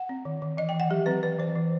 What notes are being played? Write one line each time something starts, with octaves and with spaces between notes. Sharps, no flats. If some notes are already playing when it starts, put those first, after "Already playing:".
Already playing: F#5
C4
D#3
D#3
E3 D#5
G5
E3
F#5
F#3 G4
C4 B4
E3 B4
E3 C5
E3